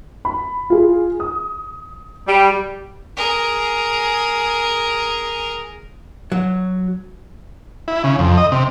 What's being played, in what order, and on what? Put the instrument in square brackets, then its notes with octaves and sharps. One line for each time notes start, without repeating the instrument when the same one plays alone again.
[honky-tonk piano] B5
F4 G#4
D#6
[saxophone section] G3
[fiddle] G#4 A#4
[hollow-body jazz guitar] F#3
[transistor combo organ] E4
C#3
F2
D#5
C3